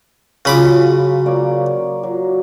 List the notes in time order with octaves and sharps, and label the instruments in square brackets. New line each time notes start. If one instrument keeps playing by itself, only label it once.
[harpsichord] C#3 B5 D6 [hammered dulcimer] F#3 F4
[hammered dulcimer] A#3 C#5 D5
F#3